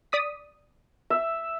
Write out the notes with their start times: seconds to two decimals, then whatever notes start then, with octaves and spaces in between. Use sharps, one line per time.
0.12 D5 D#6 B6
1.10 E5